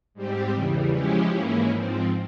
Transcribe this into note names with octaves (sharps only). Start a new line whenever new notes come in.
G#2 G3 C4 G4
E2 C#3 E3 G3
F3 G#3 C#4 E4 G4
G#2 E3 A#3 C#4 E4
G#2 F3 C4